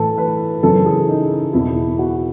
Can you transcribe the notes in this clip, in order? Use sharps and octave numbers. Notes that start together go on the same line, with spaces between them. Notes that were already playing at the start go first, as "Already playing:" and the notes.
Already playing: A2 E3 A4
B4
F#2 C#3 E3 A4
G#4
D#4
E2 B2 E4
F#4